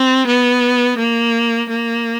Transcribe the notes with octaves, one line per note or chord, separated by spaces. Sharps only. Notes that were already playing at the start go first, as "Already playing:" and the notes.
Already playing: C4
B3
A#3
A#3